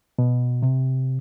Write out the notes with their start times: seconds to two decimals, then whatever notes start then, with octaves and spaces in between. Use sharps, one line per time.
0.19 B2
0.62 C3